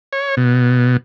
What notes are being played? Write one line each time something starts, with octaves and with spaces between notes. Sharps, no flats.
C#5
B2